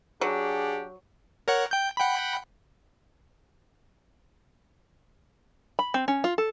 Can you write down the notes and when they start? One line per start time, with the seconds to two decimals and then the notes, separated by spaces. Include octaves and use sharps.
0.21 F#3 D4 G4 G#4 F#5
1.48 A#4 C#5 F#5
1.71 G5 G6
1.97 F#5 G5 B5
5.79 B5
5.94 C4
6.08 C#4
6.24 F4
6.38 A4